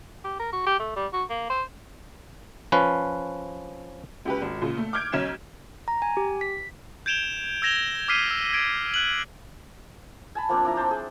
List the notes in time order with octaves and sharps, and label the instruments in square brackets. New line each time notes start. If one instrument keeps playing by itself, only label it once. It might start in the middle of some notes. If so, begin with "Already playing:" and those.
[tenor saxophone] G4
A#4
F#4
G4
A3
G3
F#4
A#3
C5
[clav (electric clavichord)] F3 C#4 B4
[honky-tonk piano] C#2 G4 B4
G#1
A#2 C#3
A3
D6 F6 G6 G#6 D7
B1 C#4 G#6 E7
[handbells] A#5
G#5
G4
B6
[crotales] G6 G#6 D7 E7 F7 G7
E6 G#6 A#6 E7 F7 G7
D6 E6 F6 B6 C7 D#7
E6
G#6 D7
F#6 F#7
[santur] G#5 A5 B5
F3 A#3 C4 D4
D4 E4 A#5
C5 G5 A5
G#4